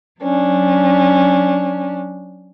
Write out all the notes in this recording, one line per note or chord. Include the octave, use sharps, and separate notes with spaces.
F#3 C#4 D4